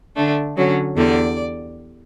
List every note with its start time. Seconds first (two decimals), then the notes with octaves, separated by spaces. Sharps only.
0.16 D3 A3 D4
0.56 D3 F#3 C#4
0.96 E2 D3 G3 D5